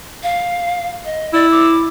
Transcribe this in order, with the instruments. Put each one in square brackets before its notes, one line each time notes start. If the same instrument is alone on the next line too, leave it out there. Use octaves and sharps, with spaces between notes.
[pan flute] F5
D#5
[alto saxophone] E4 [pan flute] D5
[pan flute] D6